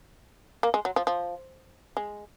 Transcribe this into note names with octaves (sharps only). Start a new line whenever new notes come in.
A#3
G#3
F#3
F3
F3
G#3